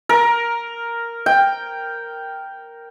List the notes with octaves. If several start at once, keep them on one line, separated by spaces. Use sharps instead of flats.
A#4
G5